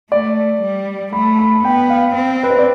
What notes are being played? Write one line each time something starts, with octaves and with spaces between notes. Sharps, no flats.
A3 D5
G3
A3 B5
B5
B3 G5
F5
C4
B4
C5
D5